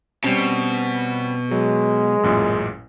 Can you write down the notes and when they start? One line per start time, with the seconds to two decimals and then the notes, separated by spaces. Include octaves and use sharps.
0.24 B2 G3 C4 C#4
1.51 F#3 G#3
2.23 A1 F#2 A#2